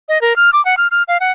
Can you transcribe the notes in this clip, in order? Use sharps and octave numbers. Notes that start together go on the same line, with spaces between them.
D#5
A#4
F6
D6
F#5
F6
F6
F5
F#5